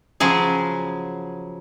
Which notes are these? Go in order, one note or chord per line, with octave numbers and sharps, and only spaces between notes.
C#3 F3 F#3 G#4